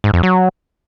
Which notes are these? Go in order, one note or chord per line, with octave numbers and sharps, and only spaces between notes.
G#2
F2
F#3